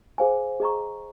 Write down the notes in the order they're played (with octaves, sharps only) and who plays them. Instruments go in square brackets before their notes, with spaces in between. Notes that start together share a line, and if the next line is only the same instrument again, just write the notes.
[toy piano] G#4 C5 F5 G#5
G#4 D#5 A#5 C#6